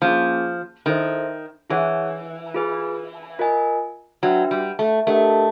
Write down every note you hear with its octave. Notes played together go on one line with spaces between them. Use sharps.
F3 A#3 C#4 F4 G#4
D#3 E4 A4 C5 E5
E3 E4 G#4 C#5 F#5
F4 G#4 B4
F4 A#4 D#5 G#5
F#3 D4 F#4 B4 E5 G5
G3
A3
A3 D4 G4 A#4 D#5 F#5